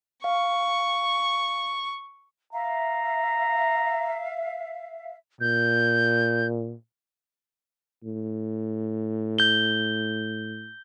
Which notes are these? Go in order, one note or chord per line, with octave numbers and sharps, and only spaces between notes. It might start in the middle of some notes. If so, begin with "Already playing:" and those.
F5 C#6
E5 F5 A#5
A#2 G6
A2
G6 G7